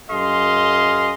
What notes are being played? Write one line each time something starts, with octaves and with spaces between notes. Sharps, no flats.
F#2 G#4 D#5 F5 C6